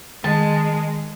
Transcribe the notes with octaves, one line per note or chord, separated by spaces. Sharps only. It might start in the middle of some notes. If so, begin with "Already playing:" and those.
D#3 G#3 G#4 A5